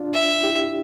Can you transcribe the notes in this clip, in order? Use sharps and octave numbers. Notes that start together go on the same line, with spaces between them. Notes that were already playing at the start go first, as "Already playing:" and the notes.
Already playing: D4 F4
E5
E4 G4